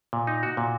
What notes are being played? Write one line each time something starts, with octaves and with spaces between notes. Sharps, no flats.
A#2
D#4
F#4
A#2